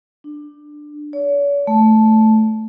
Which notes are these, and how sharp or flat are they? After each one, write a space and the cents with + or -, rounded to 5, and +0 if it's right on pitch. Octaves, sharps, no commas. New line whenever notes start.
D4 +15
C#5 +45
A3 -5